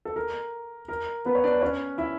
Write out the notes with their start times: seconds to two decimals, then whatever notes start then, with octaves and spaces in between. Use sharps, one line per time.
0.05 A4
0.16 A#4
0.88 A#4
1.25 B3 B4
1.35 C#5
1.44 D4 D5
1.61 C#4 C#5
1.98 E4 E5